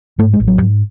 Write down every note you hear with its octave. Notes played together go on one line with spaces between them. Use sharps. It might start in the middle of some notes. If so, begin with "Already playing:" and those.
G#2 A3
G#3
A1
F#3
G#2